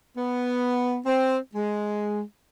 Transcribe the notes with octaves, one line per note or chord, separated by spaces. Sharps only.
B3
C4
G#3